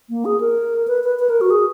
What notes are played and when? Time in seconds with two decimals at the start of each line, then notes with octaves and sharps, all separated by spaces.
0.09 A#3
0.25 G#4
0.40 A#4
0.88 B4
1.04 B4
1.19 B4
1.29 A#4
1.41 F#4
1.50 G#4